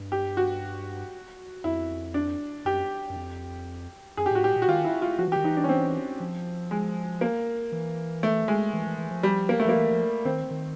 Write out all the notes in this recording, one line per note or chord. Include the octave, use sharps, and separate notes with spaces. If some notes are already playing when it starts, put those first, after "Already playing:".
Already playing: G2
G4
F#4
F2 E4
D4
F#2 G4
F#2
F2
F#2 G#4
G4
A2
G#2 F#4
A2 G4
A#2
F#4
D#3 F4
E4
F4
F3 F#4
E3
D#3 G4
E3 D#4
D4
C#4
C4
F3
G#3
A#3
E3
A3
G#3
E3
E3
E3
F3
G3
A#3
A3
F3 A#3
E3
F3
D#3 C4
D#3